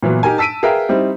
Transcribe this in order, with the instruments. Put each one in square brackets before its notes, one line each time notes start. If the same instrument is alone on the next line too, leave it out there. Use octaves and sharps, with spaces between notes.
[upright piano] A#2 E3 F#3 B3
D#4 G4 A#4 G#5
A5 E6 B6 D7 D#7
G#4 A#4 B4 E5 F5 G5
G3 C4 D#4 E4